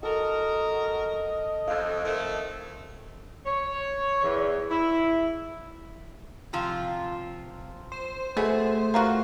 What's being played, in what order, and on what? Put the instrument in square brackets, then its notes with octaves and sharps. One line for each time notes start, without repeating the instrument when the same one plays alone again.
[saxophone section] F#4 A#4 [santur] A4 [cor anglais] D#5
[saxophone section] F2 [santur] F5 E6
[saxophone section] F2 D#3 A3
C#5
E2
E4
[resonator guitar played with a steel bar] C3 F3 F4
[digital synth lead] C5
[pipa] B2 [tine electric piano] A3 [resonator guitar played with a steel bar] G#4
[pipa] A#3 F4 F#4